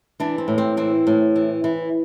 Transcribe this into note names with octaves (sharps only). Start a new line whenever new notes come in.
E3 D4
C4
A2
C4
E3 C4
A2
E3
E3